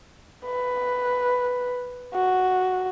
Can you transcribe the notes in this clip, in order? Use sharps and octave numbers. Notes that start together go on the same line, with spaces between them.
B4
F#4